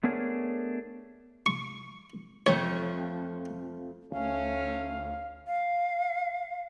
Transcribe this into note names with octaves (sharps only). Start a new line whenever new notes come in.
A3 B3 D4 G#4 A#4 C#5
C#6
F2 F3 A3 C#5
D2 A3 C#4 F5
F5